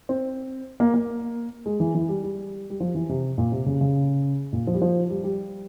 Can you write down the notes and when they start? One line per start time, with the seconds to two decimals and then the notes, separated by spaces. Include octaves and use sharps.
0.09 C4
0.80 A#3
0.94 A#3
1.66 G#3
1.80 E3
1.95 E3
2.09 G3
2.24 G3
2.70 G3
2.80 F3
2.95 E3
3.09 C3
3.38 A#2
3.52 C3
3.66 C#3
3.81 C#3
4.53 A#2
4.67 F3
4.74 G3
4.82 F3
5.10 G3
5.24 G3